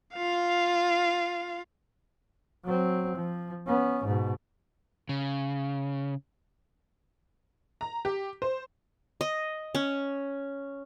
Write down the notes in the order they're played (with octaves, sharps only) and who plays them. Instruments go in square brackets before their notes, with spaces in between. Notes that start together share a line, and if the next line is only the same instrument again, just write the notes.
[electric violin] F4 F5
[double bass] F#3 C4
F3
B3 C#4
G#2 B2
[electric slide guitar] C#3
[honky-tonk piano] A#5
G4
C5
[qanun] D#5
C#4